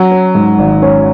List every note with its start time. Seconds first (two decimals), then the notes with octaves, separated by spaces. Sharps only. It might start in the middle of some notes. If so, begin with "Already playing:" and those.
Already playing: F#3 C#4
0.11 C#4
0.35 G#2
0.58 G#1
0.82 C#4